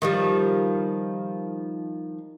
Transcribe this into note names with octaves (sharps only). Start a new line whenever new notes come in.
D#3 F3 G3